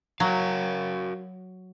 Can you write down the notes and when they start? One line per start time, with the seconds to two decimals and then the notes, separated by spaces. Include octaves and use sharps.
0.20 F#3 F#4 A#4 F5